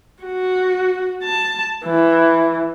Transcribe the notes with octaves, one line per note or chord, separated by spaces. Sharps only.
F#4
A5
E3